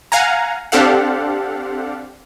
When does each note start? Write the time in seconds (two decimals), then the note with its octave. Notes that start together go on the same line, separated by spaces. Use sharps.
0.12 F5 F#5 G#5 A#5
0.72 C4 D4 G4 A4 F5 F#5